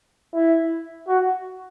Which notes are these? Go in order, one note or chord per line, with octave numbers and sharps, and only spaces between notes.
E4
F#4